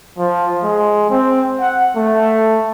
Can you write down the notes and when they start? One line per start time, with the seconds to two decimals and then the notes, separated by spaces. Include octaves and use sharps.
0.18 F3
0.63 G#3
1.10 C4
1.60 F#5
1.96 A3